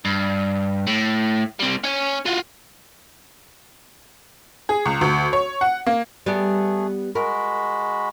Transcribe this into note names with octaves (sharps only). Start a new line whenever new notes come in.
G2
A2
G3 C4
C#4 C#5
F4 F#4
G#4
C#2
D2
C#5
F#5
A#3
G3 A3 B3 G4 G#4
G#3 F#4 A#4 B5